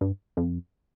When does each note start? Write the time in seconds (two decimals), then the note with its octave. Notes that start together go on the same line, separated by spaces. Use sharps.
0.01 G2
0.37 F2